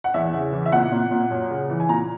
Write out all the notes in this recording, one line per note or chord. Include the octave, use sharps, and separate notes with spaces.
F#5
E2 E5
C#3
E3
E5
A#2 F#5
A#2
A#2
F#2
C#3
E3
G#5
A#2 A#5